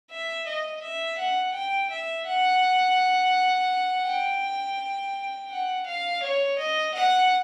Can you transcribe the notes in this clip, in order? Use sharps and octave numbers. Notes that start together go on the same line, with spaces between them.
E5
D#5
E5
F#5
G5
E5
F#5
G5
F#5
F5
C#5
D#5
F#5